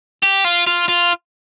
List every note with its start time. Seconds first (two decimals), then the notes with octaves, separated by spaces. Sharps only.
0.23 G4
0.44 F4
0.67 F4
0.89 F4